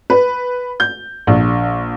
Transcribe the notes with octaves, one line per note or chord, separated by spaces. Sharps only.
B4
G6
A#1